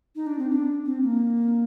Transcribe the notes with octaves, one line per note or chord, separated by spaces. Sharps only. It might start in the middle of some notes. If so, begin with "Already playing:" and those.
D#4
D4
C4
D4
C4
A#3